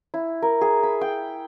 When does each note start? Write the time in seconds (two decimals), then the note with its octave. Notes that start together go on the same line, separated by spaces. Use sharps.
0.14 E4
0.42 A#4
0.61 G#4
0.83 B5
1.01 G5